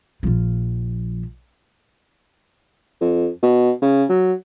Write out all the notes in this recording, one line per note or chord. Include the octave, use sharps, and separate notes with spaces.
A#1 F3
F2
B2
C#3
F#3